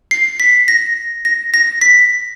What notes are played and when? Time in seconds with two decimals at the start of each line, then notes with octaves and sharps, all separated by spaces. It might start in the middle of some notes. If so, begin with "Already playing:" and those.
0.11 C7
0.40 B6
0.68 A#6
1.25 A#6
1.54 A#6
1.81 B6